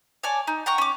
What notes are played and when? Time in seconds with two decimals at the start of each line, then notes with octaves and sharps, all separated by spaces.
0.24 C#5 D5 G#5 A5
0.47 D#4
0.66 F#5 G5 A#5 C#6
0.78 C#4 D6